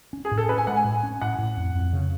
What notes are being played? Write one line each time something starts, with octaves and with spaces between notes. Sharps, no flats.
C#4
G#4
A2
A4
C#4 B4
G#5
G#3 F#5
G#5
A2
C#4
A2 F#5
A2
F2
F2
C#3